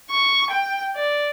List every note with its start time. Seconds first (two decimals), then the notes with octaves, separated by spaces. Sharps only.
0.10 C#6
0.50 G5
0.96 D5